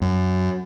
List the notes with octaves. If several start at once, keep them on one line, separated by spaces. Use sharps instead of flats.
F#2